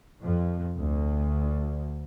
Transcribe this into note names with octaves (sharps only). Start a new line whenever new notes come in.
F2
D2